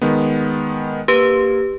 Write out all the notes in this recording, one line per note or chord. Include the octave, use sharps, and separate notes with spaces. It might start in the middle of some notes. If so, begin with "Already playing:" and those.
D#3 G#3 B3
A#3 G4 B4